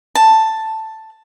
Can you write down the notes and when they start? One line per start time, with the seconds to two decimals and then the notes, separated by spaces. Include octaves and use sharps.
0.15 A5